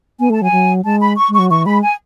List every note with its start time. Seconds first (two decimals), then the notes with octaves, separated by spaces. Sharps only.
0.19 B3 G#5
0.30 A3 A5
0.42 F#3 G#5
0.52 F#3
0.85 G#3 A5
1.01 B5
1.17 C#6
1.29 G#3
1.34 F#3 C#6
1.51 E3 C#6
1.66 G#3 B5
1.82 G#5